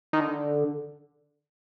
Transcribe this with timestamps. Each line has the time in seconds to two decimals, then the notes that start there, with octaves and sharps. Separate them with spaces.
0.13 D#3
0.20 D3